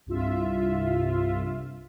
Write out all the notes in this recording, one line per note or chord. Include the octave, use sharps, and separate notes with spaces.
C2 G2 F4 E5